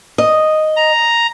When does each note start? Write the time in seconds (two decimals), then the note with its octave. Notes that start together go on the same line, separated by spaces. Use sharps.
0.18 D#5
0.76 A#5